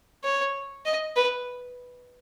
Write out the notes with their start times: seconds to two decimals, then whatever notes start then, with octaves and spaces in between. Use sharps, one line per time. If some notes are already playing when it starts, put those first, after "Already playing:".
0.24 C#5
0.86 D#5
1.16 B4